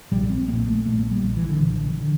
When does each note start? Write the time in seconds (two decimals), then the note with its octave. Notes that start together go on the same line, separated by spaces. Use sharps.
0.11 A#1 A#2 G3
0.30 C4
0.48 A#1 A#2 A#3
0.68 A3
0.86 A#1 A#2 A3
0.99 A#3
1.11 G3
1.23 A#1 A#2
1.37 E3
1.49 D3
1.61 A#1 A#2 E3
1.73 D3
1.85 E3
2.01 D3